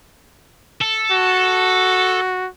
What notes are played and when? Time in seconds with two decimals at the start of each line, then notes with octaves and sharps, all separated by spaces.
0.82 A4
1.12 F#4